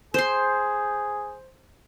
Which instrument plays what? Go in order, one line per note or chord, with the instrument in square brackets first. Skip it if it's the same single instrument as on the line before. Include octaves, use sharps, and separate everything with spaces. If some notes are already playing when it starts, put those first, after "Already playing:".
[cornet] G#4 [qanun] C5 C6